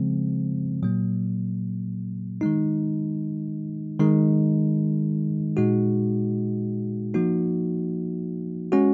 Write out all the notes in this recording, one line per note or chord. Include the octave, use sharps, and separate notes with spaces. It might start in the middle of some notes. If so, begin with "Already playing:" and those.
Already playing: C#3 F3 G#3 C4
A#2 F#3 A#3
D#3 G#3 D#4
D#3 G#3 D#4
A#2 G#3 D#4 F#4
F3 A#3 D#4 F#4
G#3 C#4 F#4